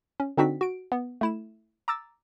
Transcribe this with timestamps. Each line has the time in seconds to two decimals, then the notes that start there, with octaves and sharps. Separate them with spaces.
0.20 C#4
0.37 D3 C4 D4 D#4 F#4 B6
0.61 F#4 D7
0.92 B3
1.21 A3 E4 E7
1.88 A#5 D6 E6 A6